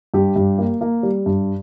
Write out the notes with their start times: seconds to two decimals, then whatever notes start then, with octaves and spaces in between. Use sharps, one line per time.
0.14 G2 G4
0.36 G2
0.58 A#3
0.81 A#3
1.03 G3
1.26 G2